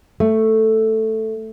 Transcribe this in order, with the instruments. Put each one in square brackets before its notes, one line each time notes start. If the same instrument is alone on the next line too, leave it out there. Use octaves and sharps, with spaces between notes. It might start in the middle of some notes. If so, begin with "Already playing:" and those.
[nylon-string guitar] A3